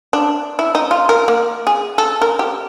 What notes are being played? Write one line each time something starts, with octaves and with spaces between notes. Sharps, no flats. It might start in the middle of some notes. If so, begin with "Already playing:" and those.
D4
E4
D#4
F4
A#4
A#3
G#4
A4
A#4
G4